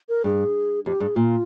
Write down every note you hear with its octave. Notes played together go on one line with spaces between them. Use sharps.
A#4
G2 G#4
F2 G4
G2 G#4
A#2 F4